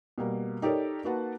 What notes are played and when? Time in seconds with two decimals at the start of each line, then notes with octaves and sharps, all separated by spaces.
0.18 B2 G3 A#3
0.62 D#4 G4 A4 A#4 C#5 D5
1.04 A#3 D#4 F#4 B4 F#5 A5